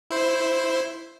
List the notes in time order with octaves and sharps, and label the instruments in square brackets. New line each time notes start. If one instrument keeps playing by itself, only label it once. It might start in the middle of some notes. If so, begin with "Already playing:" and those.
[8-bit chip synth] E4 C5